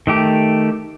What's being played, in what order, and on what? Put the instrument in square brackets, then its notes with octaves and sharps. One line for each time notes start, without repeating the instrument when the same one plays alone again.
[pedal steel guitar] D#3 A3 G4